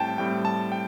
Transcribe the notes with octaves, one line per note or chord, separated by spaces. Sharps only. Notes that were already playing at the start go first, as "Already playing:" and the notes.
Already playing: A2 G3 C4 G5 A5
A2 G3 C4 G5
A5
G5